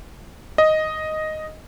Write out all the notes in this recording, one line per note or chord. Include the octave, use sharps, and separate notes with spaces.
D#5